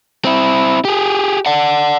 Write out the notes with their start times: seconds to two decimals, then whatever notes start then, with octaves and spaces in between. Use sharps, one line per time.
0.25 C4 E4
0.85 G4 G#4
1.46 D5 F#5